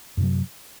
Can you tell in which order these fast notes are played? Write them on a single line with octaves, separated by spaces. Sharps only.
F#2 C3 F#3